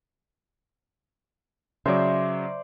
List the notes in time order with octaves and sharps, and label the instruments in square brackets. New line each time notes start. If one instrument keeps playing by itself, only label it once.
[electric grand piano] C#3 F#3 [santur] C5 D5 [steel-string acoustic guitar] E5